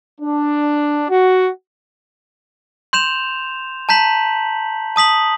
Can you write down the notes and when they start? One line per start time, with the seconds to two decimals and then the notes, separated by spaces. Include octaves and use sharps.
0.21 D4
1.10 F#4
2.93 C6 G6 E7 F7
3.89 A5 A#5 G6 B6 F#7
4.96 A5 D#6 B6 F#7